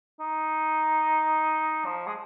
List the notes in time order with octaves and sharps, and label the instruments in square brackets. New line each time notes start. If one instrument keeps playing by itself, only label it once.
[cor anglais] D#4
F3
G#3